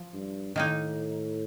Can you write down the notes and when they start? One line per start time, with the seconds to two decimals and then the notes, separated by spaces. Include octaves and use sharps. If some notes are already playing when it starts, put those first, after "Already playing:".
Already playing: F3
0.14 G2
0.55 A2 D#3 A#3 D#4